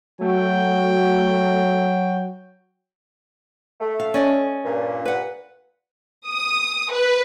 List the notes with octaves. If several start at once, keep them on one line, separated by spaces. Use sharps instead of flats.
F#3 A3 F#4 G5
A3
F5
C#4 D5 D#5
G2 A#2
B4 F#5
D#6
B4